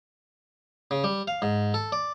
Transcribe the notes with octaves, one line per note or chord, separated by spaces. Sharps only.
C#3
G3
F5
G#2
A4
D5